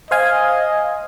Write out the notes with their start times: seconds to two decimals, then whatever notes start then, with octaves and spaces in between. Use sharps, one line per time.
0.11 C5 D#5 F5 G#5